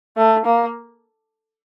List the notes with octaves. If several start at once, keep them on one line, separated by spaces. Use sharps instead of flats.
A3
A#3